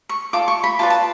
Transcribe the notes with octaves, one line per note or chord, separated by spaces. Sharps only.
C#6
F4 A4 D5 D6
C#6
B5
F4 B4 D5 A5
A5